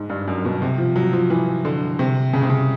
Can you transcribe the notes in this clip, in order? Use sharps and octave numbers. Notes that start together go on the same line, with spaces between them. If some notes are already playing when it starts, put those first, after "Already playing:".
Already playing: G#2
G2
F#2
B2
C3
F3
F#3
F3
E3
D3
C3
C#3
C3
C#3